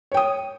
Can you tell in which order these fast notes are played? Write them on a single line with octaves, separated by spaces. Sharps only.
C#5 G5 D#6